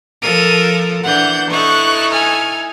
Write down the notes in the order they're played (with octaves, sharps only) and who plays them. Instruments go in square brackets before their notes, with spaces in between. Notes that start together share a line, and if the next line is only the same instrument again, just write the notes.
[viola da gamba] F3 A4 A#4 [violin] D#7
[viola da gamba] E3 D4 [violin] F#5 G6
[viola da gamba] D#4 E4 A4 [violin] C#6 F#6
[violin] G#5 F6